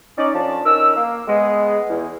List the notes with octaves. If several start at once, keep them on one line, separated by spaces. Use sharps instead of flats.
C#4 D#4 D5
F2 F3 C#4 D4 A5
C#4 D#4 A#4 E6
A#3
G#3 B3
E2